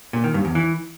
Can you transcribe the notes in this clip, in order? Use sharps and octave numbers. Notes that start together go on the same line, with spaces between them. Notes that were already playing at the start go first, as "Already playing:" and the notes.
A#2
D#3
G2
E2
E3